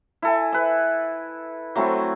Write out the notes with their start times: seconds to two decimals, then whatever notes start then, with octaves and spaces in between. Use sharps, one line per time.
0.22 E4 A4 G#5
0.52 B4 E5
1.75 F#3 A3 C4 E4